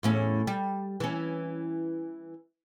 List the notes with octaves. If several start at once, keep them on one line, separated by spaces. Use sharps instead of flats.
E2 A2 C#4
G3
E3 C#4